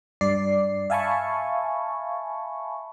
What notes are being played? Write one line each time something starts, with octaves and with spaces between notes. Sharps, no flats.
G2 D5 C7
E5 F5 G#5 A5 B5 C#6